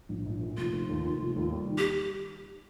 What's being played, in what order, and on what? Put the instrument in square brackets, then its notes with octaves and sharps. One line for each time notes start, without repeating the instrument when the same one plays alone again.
[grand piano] A#1
A#1
A#2
[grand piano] F1 [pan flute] F4
[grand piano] F1
D#2
D#3
F1
D#2
G3
D#3
[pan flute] G4